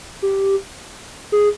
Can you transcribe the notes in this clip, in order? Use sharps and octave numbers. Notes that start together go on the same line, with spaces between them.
G4
G#4